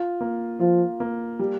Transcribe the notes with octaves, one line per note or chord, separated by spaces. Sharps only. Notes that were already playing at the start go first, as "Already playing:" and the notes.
Already playing: F4
A#3
F3 F4
A#3
G3